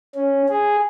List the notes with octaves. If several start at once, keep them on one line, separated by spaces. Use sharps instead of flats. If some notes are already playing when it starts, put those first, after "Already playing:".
C#4
G#4